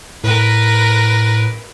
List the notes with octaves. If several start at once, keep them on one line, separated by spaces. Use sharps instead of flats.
A2 A#4 B4